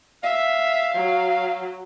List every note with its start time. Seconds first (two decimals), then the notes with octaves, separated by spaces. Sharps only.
0.23 E5 F5
0.95 F#3